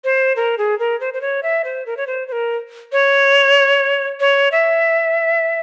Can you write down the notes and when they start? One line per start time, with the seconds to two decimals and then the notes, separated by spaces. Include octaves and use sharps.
0.04 C5
0.36 A#4
0.58 G#4
0.79 A#4
1.00 C5
1.14 C5
1.21 C#5
1.43 E5
1.64 C5
1.86 A#4
1.97 C#5
2.07 C5
2.28 C5
2.32 A#4
2.92 C#5
4.20 C#5
4.52 E5